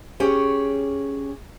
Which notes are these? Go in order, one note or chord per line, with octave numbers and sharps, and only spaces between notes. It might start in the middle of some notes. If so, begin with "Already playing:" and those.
C#4 G4 G#4 C#5